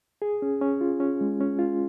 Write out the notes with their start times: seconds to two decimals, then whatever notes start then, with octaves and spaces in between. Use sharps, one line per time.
0.22 G#4
0.42 C#4
0.61 C#4
0.81 F4
1.00 C#4
1.21 G#3
1.40 C#4
1.59 F4